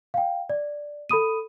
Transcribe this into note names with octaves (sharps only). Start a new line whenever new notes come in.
F5 G5
D5
A4 B5 D#6 D#7